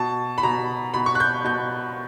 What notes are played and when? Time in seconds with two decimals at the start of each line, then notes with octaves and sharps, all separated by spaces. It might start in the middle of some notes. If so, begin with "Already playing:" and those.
Already playing: B2 A5
0.38 B5
0.43 B2 A#5
0.94 B2 B5
1.06 C#6
1.15 F#6
1.20 G6
1.44 B2 G6